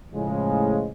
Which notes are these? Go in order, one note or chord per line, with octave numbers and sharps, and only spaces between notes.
A2 C#3 F3 G#3